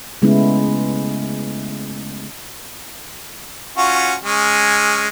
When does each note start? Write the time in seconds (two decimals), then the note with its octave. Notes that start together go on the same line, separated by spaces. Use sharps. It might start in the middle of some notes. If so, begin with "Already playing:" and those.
0.22 C#3 G#3 A3 B3 C#4 E4
3.77 C#4 F4 F#4
4.24 G#3 C#4